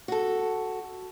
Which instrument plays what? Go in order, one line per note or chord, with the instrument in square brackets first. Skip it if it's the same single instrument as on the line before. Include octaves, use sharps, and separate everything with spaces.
[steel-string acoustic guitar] F#4 A4